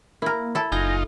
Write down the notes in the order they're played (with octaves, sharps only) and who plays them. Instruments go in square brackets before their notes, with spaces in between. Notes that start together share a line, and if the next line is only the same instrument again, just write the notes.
[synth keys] A#3 [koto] E4 A#4
[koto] E4 A4
[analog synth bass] F#1 [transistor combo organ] D#4 F4 [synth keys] G#5 G6 A#6